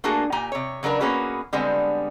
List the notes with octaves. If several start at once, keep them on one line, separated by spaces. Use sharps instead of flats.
A3 A#3 D4 F#4 G#4
A#2 G4 G#5 A#5
C3 C#5
C#3 F#3 D4 A#4 B4
A#3 B3 C#4 F#4 G#4 B4
D3 G3 G#3 B3 C4